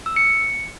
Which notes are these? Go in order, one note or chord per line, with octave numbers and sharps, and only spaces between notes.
E6
C#7
C#7